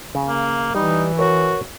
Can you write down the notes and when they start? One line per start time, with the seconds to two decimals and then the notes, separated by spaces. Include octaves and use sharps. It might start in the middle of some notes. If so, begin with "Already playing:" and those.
0.15 C#3
0.28 A#3
0.75 E3 G3 D#4
1.19 F#4 A#4 C#5